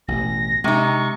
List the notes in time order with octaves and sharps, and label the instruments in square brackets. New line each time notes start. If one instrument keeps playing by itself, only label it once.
[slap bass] A1 B2 [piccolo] A#6
[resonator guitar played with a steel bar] C3 D#4 [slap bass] G#3 [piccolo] C#6